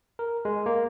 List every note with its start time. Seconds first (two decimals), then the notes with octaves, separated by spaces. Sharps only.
0.19 A#4
0.45 G#3
0.66 A#3